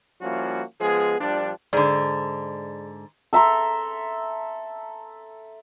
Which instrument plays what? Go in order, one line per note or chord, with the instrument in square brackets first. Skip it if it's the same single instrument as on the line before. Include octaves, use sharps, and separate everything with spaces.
[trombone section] F3 G3 A#3 C#4 E4 F#4
F3 G#3 B3 G#4
A#1 F3 G3 D4
[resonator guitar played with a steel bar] G#2 D3 [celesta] G#4 D5
[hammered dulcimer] A4 E5 A#5 C6